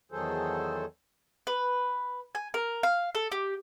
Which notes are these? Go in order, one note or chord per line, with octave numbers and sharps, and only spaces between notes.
E2 D#3 F#3 G#4 A4 C5
B4
G#5
A#4
F5
A4
G4